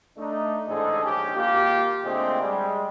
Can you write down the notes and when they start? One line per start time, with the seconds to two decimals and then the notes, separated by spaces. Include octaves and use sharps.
0.18 A3 D4 D#4
0.68 A1 G#2 D3 D#4 G#4 A4
1.03 A#1 G#2 C#4 D4 G4
1.36 G#1 A#3 F4 G4
2.04 A#2 D3 G#3 A3 C4
2.41 G3 G#3